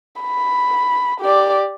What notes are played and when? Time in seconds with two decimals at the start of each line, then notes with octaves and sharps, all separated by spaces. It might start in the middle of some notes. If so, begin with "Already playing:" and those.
0.22 B5
1.21 G4 D5